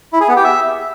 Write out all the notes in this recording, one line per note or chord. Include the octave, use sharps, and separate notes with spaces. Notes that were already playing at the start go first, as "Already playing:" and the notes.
E4
G#4
B3
G4
E5